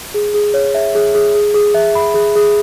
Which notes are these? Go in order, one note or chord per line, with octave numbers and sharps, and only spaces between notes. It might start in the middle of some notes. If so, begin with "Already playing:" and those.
G#4
G#4
C#5
E5
G#4
G#4
G#4
G#4
E5
B5
G#4
G#4